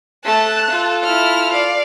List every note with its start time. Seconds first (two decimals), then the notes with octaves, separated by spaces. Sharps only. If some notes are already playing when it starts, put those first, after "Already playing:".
0.25 A3 A5 F#6
0.70 F4 A4
1.04 E4 F6
1.53 D5 F5